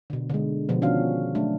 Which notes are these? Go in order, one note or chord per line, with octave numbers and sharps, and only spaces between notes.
B2 D3
D3 G#3
B2 D3 F3 B3
D#3 C#4 D4 F#4 F5
F#3 A3 D4